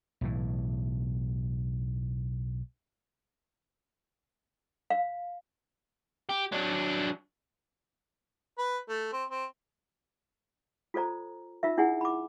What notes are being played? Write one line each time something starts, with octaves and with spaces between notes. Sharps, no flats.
B1 A2 E3
F5
G4
F#3 D4
B4
A3
C4
C4
F4 A4 C5 D5 A#5
D#4 F4 A#4 E5
D4 E4 G#4 F#5 G#5
B5 D6